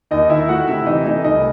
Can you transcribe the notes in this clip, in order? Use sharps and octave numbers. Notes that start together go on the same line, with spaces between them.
D#2 D#4 D#5
D#3 E4 E5
A3 F#4 F#5
C3 E4 E5
E3 D#4 D#5
A3 D#4 D#5
C2 D#4 D#5